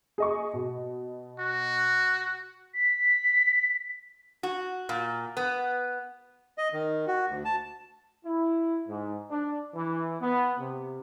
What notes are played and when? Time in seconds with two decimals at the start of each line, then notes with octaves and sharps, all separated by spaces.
0.18 G#4 D#5 C#6
0.53 B2
1.39 F#4
2.74 B6
4.43 F#4
4.89 A#2
5.37 B3
6.58 D#5
6.73 D#3
7.07 F#4
7.30 D2
7.45 A5
8.25 E4
8.88 G#2
9.30 D4
9.75 E3
10.20 B3
10.59 C3